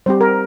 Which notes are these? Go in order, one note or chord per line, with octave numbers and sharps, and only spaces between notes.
G3 C4 G4 C5
A#4